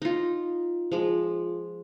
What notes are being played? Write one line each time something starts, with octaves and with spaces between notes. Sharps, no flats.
D#4 F4
F3 G#3